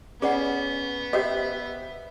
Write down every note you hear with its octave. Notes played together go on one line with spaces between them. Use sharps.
B3 C#4 G#4 D5 F#5
G4 C5 D#5 E5